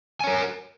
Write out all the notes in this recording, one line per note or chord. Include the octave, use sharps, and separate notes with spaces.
A#4 C#5 G#5